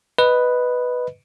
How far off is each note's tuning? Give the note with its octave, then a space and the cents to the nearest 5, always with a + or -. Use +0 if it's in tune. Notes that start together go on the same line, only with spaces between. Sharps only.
B4 +0 D#5 +0